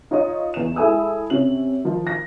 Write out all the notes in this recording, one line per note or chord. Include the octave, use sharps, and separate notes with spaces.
D#4 F4 C#5 D#5 D#6
E2 E7
G#3 E4 A4 G#5 D#6 E6
C3 C#4 F#7
D#3 F3
A#6